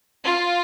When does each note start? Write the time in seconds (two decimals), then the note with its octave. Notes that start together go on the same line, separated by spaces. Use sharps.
0.24 F4